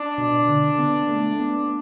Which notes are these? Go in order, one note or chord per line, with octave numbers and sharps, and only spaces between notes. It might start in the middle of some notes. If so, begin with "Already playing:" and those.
Already playing: D4
B2
D3
B3
A3
B3